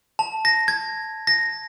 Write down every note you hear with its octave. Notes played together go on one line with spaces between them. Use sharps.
A5
A#6
G#6
A#6